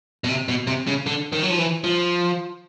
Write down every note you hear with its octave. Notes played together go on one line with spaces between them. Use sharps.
B2
C3
B2
C3
C#3
D3
D#3
F#3
F3
E3
F3